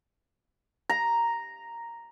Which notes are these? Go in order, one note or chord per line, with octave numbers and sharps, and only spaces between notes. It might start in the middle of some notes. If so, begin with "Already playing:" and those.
A#5